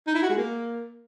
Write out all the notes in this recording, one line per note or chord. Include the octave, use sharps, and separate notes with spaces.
D#4
E4
F#4
G#3
A#3